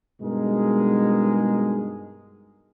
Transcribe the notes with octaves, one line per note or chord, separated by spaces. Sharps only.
G2 B2 G#3 D#4 G#4 A#4